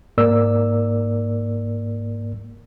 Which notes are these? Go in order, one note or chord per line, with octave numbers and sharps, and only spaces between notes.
G#2 A#3 A#4 D5 E6